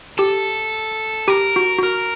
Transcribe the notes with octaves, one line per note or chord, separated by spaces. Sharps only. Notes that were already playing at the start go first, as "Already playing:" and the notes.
G4 A4
G4 A#4
F#4
F#4 A#4